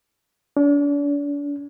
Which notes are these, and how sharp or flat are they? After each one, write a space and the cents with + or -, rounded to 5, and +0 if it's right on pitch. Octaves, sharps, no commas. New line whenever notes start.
D4 -40